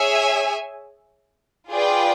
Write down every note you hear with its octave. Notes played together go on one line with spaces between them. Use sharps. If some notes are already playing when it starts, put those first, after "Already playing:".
Already playing: G#4 C#5 E5 G#5
F4 G#4 B4 D5 G5